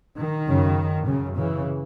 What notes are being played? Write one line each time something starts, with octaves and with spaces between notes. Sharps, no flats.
D#3
F#2 C#3
F#2 C#3
C#3 E3